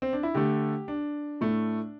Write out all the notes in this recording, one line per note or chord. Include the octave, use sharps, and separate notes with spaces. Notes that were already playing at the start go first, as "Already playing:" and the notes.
C4
D4
E4
D3 A3 G4
D4
A2 A3